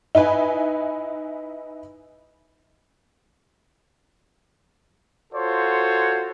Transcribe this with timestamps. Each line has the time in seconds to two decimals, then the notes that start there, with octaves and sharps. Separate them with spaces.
0.15 D#4 E4 B4 G#5
5.32 F4 F#4 A4 C5 C#5